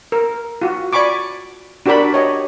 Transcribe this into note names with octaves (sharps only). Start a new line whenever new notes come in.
A#4
F4 F#4
D5 G#5 B5 C#6 D6
D4 F#4 G4 A#4 D5 B5
G4 C#5 D#5